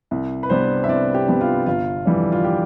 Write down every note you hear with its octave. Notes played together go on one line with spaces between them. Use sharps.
C2
B4
C3 G3 B3 D4 C5
E5
C2 D5
G4
C3 G3 B3 D4
F4
G1 F4
F2 E3 G3 D4
F4
G4